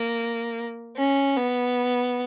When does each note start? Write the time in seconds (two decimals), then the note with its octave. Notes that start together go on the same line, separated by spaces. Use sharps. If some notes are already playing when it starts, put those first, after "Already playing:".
Already playing: A#3
0.97 C#4
1.37 B3